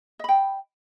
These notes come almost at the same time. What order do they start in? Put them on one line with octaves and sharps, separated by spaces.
D#5 B5 G5